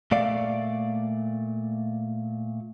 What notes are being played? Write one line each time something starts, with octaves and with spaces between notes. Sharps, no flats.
A#2 A3 D5 F5